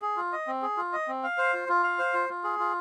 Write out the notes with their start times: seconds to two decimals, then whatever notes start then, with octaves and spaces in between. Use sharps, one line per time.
0.02 G#4
0.17 F4
0.33 D#5
0.47 C4
0.62 G#4
0.77 F4
0.93 D#5
1.08 C4
1.23 F5
1.38 C5
1.53 F4
1.69 F4
1.84 F5
1.99 C5
2.14 F4
2.29 F4
2.44 G#4
2.59 F4